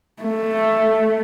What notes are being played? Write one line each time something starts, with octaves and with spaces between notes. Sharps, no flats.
A3